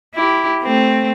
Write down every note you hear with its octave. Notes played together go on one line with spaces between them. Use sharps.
E4 G4
A3 C4